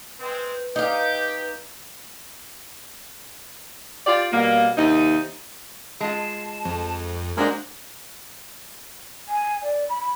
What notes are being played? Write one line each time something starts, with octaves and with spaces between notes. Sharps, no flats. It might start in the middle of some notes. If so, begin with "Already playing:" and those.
G#3 C4 B4
D#4 G4 F5 G6
F4 G4 D5
B2 G3 A#3
D#2 C3 D#4
G#3 F4 A5
F2
G#3 A#3 D4 F#4 C5
G#5
D5
B5